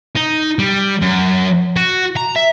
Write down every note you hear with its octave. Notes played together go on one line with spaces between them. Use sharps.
D#4
G3
F#2
F#4
A#5
E5